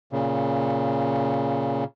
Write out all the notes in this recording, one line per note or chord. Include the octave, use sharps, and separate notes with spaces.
A#2 C#3